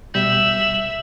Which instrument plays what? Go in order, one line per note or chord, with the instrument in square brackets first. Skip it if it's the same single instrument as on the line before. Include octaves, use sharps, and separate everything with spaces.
[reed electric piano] B2 G3 G6 [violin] E5 [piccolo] F#7